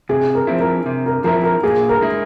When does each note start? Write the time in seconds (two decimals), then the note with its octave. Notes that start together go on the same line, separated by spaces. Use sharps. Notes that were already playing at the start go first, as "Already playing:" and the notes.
0.09 C3 G#4
0.35 A#4
0.47 F3 C4 E4
0.60 A#4
0.86 C3
1.06 A#4
1.24 F3 C4 E4 A#4
1.44 A#4
1.63 A#2 G#4
1.89 A#4
2.01 G#3 E4